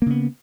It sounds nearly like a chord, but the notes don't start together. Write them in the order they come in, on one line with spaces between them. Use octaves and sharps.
A#3 C#3 B3